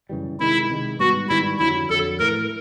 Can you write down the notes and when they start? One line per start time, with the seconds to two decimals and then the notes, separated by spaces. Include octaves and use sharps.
0.09 F#2 C#3 E3 G3
0.40 C3 D#3 G#3 E4
0.70 C3 D#3 G#3
0.99 G#2 D#3 G3 B3 F#4
1.29 G#2 D#3 G3 B3 E4
1.59 F2 D3 F#3 E4
1.90 F2 D3 F#3 A4
2.19 A2 E3 A3 A#4